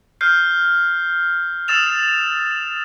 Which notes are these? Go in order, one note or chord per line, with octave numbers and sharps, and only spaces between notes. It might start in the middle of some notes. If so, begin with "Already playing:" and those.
F6 G6 C7
D#6 E6 A6 E7 F7